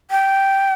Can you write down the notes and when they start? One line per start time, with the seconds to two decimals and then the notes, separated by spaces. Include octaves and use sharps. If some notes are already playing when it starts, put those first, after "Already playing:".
0.11 G5